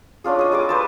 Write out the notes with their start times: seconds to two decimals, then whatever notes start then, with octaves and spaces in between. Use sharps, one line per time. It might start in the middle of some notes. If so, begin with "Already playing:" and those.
0.24 C#4 D4 F4 G#4
0.39 G#4 D#5
0.52 G3 G#4 D#5 D6
0.69 B4 C5 A5